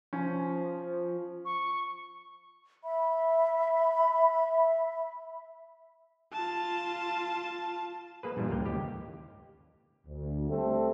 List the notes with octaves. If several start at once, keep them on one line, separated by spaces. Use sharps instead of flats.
F3 C#4
C#6
E5 B5
F4 A5
A#3 G#4 B4
G2 A#2 E3 G3
C#2 A2 A#3 F5 G5
D#2 G4
D2
G3 A3 C4 A4